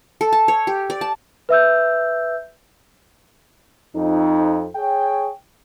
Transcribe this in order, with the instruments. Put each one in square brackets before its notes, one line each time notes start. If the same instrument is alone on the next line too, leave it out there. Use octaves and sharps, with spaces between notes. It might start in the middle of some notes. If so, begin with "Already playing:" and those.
[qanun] A4
A5
C#5
G4
D5
A5
[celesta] B4 E5 E6 G6
[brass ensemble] F2 D#4
G#4 C#5 G5